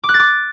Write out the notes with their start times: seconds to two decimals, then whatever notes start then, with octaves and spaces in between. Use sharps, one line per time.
0.04 D6
0.09 F#6
0.14 A6
0.19 D6